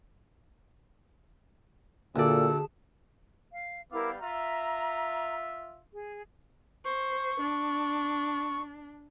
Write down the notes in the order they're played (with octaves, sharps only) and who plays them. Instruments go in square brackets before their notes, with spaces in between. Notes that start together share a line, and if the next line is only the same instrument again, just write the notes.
[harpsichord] D2 D5 [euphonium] A#2 [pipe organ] G#4 A5 [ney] A4
[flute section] F5
[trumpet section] G3 B3 F5 [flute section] E4 A#4 D6
[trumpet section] F4 E5 [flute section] A#5
[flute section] G#4
[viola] C5 [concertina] C#6
[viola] D4